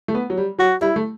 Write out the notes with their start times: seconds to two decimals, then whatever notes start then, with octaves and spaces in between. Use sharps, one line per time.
0.08 A3
0.14 B3
0.30 F#3
0.37 G3
0.59 F#3 F#4
0.81 G3 E4
0.96 A3